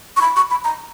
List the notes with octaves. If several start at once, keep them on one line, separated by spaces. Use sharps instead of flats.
C#6
B5
C#6
B5
A#5